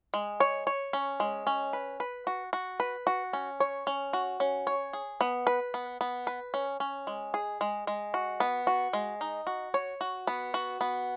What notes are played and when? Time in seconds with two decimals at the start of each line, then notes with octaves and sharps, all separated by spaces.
0.14 G#3
0.40 C#5
0.67 C#5
0.93 C#4
1.20 G#3
1.47 C#4
1.73 B4
2.00 B4
2.27 F#4
2.53 F#4
2.80 B4
3.07 F#4
3.33 C#4
3.60 C#5
3.87 C#4
4.13 F#4
4.40 C#4
4.67 C#5
4.93 G#4
5.21 B3
5.47 B4
5.74 B3
6.01 B3
6.27 B4
6.54 C#4
6.80 C#4
7.07 G#3
7.34 G#4
7.61 G#3
7.87 G#3
8.14 F#4
8.40 B3
8.67 F#4
8.93 G#3
9.21 D#4
9.47 F#4
9.74 C#5
10.01 F#4
10.27 B3
10.54 F#4
10.81 B3